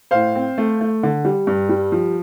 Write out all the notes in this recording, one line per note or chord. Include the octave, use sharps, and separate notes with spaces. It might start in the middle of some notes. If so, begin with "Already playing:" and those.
A2 C5 F5
C4
A3
A3
D3
G3
G2
G3
F3